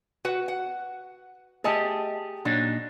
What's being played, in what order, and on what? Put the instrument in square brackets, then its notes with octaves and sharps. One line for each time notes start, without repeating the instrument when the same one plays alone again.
[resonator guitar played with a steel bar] F#4 B4 F#5
F#5
[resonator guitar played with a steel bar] A3 D#5 A5 [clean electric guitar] G4 G#4
[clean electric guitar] A#2 D4 D#4 [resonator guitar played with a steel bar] F#3